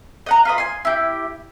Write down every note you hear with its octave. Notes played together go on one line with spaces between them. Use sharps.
D#5 F#5 A#5
F4 B4 D#5
G#5 C6
E4 G4